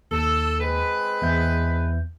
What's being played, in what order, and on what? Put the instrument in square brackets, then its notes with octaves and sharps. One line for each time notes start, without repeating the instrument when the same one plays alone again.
[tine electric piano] D#2 [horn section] A4
[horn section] G#3 C4 B4
[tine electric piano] E2 E5 G6